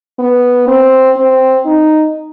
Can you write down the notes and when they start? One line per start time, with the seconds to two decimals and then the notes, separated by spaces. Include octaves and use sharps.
0.19 B3
0.68 C4
1.17 C4
1.66 D#4